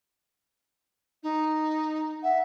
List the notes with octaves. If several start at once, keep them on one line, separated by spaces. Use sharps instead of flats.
D#4
E5 F#5